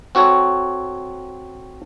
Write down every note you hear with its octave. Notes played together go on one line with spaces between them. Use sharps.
C4 F#4 A4 C#5